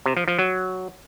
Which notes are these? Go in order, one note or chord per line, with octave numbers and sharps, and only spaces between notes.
C3
F3
F3
F#3